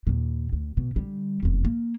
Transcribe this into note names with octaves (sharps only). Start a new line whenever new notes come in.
D#2 A#2
D2
B2
D3 G3
F1 E2
A#3